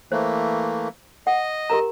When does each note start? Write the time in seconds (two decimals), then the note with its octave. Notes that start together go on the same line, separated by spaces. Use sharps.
0.12 E3 A3 A#3 C5
1.27 D#5 F#5
1.70 G4 A#4 A#5